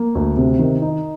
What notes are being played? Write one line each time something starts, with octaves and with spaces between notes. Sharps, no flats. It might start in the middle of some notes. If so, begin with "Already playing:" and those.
Already playing: A#3
D2
C3
D#3
D#4